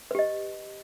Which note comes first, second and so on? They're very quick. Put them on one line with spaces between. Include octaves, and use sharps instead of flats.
B4 G4 D#5